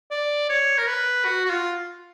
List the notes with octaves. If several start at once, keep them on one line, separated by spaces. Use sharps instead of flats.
D5
C#5
A#4
B4
F#4
F#4
F4